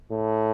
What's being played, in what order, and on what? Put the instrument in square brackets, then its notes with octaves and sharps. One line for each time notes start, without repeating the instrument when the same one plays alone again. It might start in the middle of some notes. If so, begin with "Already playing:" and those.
[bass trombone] A2